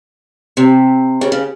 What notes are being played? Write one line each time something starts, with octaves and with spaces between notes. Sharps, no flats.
C3
C#3
C#3